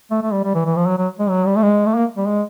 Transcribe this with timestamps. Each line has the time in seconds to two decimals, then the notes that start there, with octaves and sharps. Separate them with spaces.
0.11 A3
0.22 A3
0.32 G3
0.44 G3
0.55 E3
0.65 E3
0.76 F3
0.87 F#3
0.98 F#3
1.19 G#3
1.30 F#3
1.47 G3
1.56 A3
1.63 G#3
1.86 A3
1.95 A#3
2.17 G3
2.28 G#3